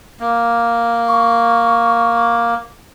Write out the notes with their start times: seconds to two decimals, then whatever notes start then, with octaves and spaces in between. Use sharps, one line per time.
0.20 A#3
1.08 C#6